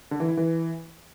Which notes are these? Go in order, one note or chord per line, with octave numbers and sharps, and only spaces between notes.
D3
E3
E4
E3